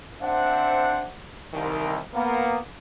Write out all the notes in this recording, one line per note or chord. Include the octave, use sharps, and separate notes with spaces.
C4 D4 C5 E5 F#5
C2 D#3
A#3 B3